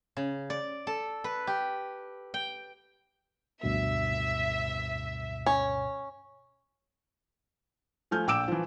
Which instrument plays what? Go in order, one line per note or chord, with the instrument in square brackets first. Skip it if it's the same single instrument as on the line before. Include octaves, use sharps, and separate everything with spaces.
[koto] C#3
D5
A4
B4
G4
G5
[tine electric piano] D2 G2 B2 [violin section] E5
[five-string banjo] C#4
[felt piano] F3 A3 G#5 F6 G6
A#1 G5 D6 E6 D7 E7
E3 F3